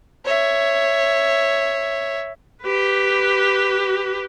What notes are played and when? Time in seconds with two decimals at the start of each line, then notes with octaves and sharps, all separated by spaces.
0.25 C#5 E5
2.63 G4 B4